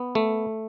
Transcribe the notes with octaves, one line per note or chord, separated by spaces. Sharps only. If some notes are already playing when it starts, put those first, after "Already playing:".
Already playing: B3
A3